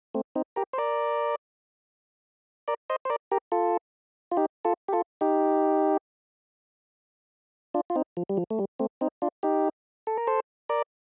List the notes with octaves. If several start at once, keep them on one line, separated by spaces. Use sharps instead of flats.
A3 C4
C4 D#4
G4 A#4
C5
A#4 D5
A#4 D5
C5 D#5
C5
A#4 D5
G4 A#4
F4 A4
F4
D#4 G4
F4 A4
G4
F4 A4
D#4 G4
D4 F4
F4
C4 D#4
F3
G3
F3
A3
G3
A3 C4
C4 D#4
D4 F4
D#4 G4
A4
A#4
A4 C5
A#4 D5